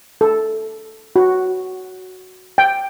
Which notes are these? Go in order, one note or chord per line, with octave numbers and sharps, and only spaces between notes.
A4
F#4
G5